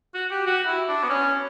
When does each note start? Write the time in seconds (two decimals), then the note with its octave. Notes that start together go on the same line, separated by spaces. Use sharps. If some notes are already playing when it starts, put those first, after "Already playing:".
0.15 F#4
0.31 G4
0.46 F#4
0.67 E4
0.89 D4
1.03 B3
1.10 C#4